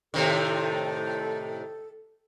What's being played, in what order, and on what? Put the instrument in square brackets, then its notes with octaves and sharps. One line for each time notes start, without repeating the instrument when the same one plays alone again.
[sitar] A2 C3 D#3 [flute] A4